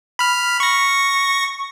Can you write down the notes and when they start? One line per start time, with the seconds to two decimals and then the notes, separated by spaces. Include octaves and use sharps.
0.19 B5 F6
0.60 C#6 A#6